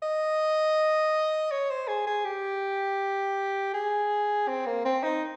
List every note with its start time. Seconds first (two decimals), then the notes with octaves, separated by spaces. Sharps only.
0.03 D#5
1.51 C#5
1.70 C5
1.88 G#4
2.07 G#4
2.25 G4
3.74 G#4
4.48 C4
4.66 A#3
4.85 C4
5.03 D#4